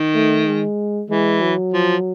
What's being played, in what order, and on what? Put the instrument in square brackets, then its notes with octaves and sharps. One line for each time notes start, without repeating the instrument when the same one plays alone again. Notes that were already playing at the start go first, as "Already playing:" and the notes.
Already playing: [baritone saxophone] D#3
[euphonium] A3
G#3
[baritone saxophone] E3 [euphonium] G#3
[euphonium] F#3
[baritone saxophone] F3